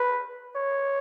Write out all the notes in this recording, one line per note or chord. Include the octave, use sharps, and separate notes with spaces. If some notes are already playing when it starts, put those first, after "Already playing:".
Already playing: B4
C#5